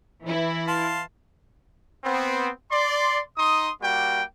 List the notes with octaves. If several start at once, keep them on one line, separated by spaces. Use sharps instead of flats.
E3 E4
F5 A5 C6
B3 C4
D5 C6
D#4 C6 D#6
G3 A#3 F#4 G5